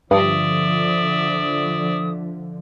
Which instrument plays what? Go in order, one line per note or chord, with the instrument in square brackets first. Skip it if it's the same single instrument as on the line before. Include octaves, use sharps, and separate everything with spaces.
[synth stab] G2 [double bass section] D3 F3 [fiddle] D5 E5 [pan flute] D#6